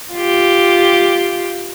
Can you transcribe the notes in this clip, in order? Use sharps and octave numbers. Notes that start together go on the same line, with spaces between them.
F4 G4